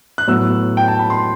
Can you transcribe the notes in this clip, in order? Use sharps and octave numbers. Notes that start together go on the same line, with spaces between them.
F#6
A2 F#3 B3 E6
G5
A5
B5
C6